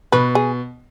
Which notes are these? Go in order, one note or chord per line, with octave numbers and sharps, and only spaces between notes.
B2 B4
G#4